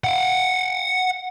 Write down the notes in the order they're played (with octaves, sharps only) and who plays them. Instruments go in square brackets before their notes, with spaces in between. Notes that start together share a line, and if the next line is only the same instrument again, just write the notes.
[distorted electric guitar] F5 F#5